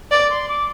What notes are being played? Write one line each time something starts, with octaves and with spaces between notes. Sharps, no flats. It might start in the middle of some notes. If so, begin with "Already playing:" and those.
D5 D6
C6
D6